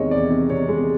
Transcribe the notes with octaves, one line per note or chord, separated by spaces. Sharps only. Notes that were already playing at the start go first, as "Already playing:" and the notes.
Already playing: E2 C3 D#3 G#3 C#5 D#5
E2 D5
C3
C3 C#5
G#3